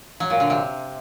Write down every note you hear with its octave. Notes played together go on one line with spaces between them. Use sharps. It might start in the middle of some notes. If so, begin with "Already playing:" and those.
F#3
A#2
D3
C3